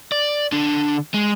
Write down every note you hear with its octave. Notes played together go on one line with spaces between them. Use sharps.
D5
D3 D4
G#3